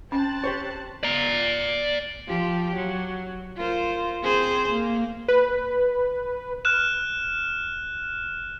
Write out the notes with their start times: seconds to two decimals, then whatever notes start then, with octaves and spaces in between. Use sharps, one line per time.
0.12 C4 C#4 A5 F#6
0.44 G4 C5 C#5
1.03 D5 A#5
2.27 F3 G4
2.75 F#3
3.56 F4 A#4 C5
4.23 C4 G#4 C5
4.69 A#3
5.28 B4
6.65 F6 F#6 E7